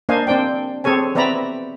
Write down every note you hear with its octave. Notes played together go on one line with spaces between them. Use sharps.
A#3 D4 C5 D#5 F5 G#5
C4 D4 C5 D5 G5
C4 G#4 A4 C#5 G#5
B3 C4 D5 E5 A#5 B5